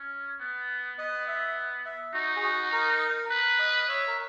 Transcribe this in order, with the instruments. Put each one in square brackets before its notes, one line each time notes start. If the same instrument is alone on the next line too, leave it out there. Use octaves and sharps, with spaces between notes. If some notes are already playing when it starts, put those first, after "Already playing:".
Already playing: [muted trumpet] C#4
B3
[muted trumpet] B3 [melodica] D#5
[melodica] E5
E5
[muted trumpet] D#4 [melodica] F#4
[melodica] G#4
F#4
A#4
[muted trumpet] B4
[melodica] D#5
[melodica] C#5 [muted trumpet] E5
[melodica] A#4